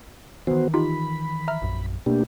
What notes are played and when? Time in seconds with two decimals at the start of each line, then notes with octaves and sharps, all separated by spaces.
0.47 D#3 E3 B3 F#4 C5
0.74 D#4 F4 G4 B5
1.48 E5 A#5 F6
1.62 A#1 F#2
2.06 B2 A3 A#3 D4 G4